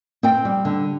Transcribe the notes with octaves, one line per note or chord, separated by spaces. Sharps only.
C4 G5
G3
D3